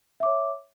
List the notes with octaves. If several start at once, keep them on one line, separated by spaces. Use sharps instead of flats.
C#5 E5 D6